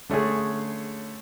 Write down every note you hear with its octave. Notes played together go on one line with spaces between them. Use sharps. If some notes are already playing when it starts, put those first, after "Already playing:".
D3 A3 C#4 G#4